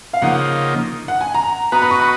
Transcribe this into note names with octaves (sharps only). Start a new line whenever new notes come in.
F5
C#3 F3 A#3 D#4 F#5
F#5
G#5
A#5
B3 F#4 B4 D#5 A#5
B5
C#6
B5